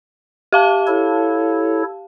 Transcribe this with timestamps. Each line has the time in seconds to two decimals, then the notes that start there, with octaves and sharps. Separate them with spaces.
0.52 G4 F5 A5
0.87 E4 A4 C#5